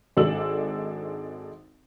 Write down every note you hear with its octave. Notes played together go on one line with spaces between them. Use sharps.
G#1 G#3 D4 A4 E6 F#7